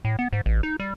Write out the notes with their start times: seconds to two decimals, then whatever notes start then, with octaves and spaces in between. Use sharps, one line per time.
0.05 A2
0.19 B3
0.33 G#2
0.46 A1
0.63 D#4
0.80 G3